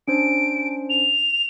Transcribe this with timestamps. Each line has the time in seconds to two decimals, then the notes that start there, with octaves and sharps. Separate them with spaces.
0.08 C#4 D4 C5 D7
0.90 F7